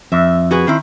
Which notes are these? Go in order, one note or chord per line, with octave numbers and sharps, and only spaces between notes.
F2 E5
F#4 G#4 B4
D#3 C4 E4